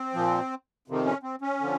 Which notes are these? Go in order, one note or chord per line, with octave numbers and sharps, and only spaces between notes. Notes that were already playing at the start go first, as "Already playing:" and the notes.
Already playing: C4
A#2 F3
F2 C3 D#3
C#4
C4
C#4
D3 F3